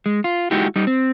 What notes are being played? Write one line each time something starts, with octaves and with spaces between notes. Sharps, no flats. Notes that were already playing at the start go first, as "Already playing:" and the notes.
G#3
F4
G#3 D#4 E4 F#4 G4
G3 D#4
C4